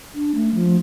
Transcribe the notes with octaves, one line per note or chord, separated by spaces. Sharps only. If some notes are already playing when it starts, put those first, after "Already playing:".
D4
A3
F3